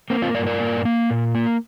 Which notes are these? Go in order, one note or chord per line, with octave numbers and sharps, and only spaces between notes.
A#3 C4
C4 F4
G2 A#4 D5
A#4 D5
A#3
A#3
A#2
A#3